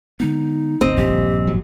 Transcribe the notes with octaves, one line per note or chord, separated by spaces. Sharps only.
D3 G#3 B3 D#4
D1 G1 C4 D#5
A#1 G2 G4
G#1 F#3